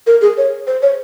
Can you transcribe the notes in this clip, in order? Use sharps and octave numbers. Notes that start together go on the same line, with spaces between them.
A#4
G#4
C#5
C5
C#5